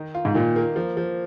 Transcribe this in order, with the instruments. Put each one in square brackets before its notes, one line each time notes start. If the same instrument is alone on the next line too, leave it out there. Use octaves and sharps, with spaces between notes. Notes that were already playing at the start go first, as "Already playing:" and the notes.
Already playing: [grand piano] D#3 D#4
F4
[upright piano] G#2
[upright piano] A#2 [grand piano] D#3
[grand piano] A#3
F3
F3